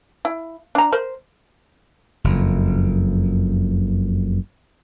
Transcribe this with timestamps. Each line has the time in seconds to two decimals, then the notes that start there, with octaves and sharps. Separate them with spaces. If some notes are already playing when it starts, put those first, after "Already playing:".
0.25 E4
0.75 D4 A#5
0.93 A#4 C5
2.24 F#1 F2